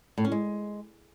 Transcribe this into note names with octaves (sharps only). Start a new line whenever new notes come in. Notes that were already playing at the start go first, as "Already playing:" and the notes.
A2
C#4
G#3